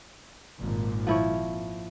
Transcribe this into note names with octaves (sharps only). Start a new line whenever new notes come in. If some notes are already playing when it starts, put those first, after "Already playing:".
G#1 A#2
F3 E4 C#5